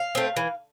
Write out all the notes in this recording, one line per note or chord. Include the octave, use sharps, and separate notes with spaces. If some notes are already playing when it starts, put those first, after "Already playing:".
Already playing: F5
A3 C4
E3